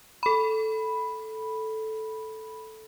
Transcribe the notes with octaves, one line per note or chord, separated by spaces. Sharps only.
A4 B5